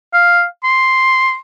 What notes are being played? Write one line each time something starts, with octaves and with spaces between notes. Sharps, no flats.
F5
C6